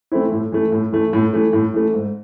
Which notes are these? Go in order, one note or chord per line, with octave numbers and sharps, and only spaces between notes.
E3 A3 C4 E4
A2
E3 A3
A2
E3 A3
A2
E3 A3
A2
E3 A3
G#2